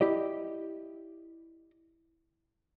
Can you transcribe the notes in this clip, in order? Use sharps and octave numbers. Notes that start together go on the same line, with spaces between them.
E4 G4 D5 D#5